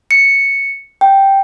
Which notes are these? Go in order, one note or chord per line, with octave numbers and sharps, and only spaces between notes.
C#7
G5